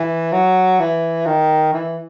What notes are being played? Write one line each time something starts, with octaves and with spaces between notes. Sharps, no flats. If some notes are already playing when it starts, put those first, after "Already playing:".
Already playing: E3
F#3
E3
D#3
E3